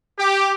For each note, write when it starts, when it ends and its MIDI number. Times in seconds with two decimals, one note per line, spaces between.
0.18 0.52 67